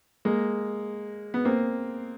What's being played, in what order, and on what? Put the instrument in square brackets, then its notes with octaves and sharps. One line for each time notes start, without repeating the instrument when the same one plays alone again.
[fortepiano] G#3 A#3
B3
A#3 C4